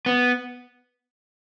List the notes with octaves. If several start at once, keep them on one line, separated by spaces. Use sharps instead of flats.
B3